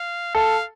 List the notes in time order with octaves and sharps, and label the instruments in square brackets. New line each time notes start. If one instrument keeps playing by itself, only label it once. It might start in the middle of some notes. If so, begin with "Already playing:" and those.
Already playing: [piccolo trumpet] F5
[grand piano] A4 [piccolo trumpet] F5